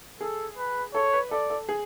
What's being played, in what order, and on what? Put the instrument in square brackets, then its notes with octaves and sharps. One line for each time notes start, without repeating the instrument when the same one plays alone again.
[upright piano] G#4 [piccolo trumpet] A4
[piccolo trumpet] B4
[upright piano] A4 [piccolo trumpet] C#5
[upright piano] B4
[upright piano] A4 [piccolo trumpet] D5
[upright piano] A4
G#4